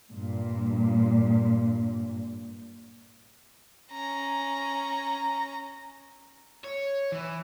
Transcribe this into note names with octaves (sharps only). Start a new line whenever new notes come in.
G2 A#2
C#4 A#5
C#5
E3